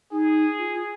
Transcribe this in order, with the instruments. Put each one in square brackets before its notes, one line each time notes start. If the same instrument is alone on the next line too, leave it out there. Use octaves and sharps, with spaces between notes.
[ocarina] D#4 [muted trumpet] G#4
[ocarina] F4